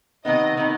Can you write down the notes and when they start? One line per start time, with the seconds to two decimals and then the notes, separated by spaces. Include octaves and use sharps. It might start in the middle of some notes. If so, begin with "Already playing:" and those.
0.25 C3 D#3 B3 D#4 D#5
0.57 C3 D#3 B3 D#4